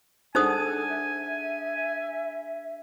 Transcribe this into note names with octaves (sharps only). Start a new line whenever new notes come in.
D4 D#4 G#4 A4 C5 F#5 G#5 D#6
E5